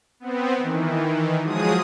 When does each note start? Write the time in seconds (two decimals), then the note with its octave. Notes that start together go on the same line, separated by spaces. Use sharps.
0.20 B3 C4
0.57 D#3 E3
1.42 F3 F#3 G#3 G#4 D#6